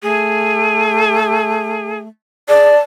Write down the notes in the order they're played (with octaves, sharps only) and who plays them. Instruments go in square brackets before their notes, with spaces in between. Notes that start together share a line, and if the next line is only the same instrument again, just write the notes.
[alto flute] A3 [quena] G#4
[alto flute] G#4 [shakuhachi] D5 [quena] A5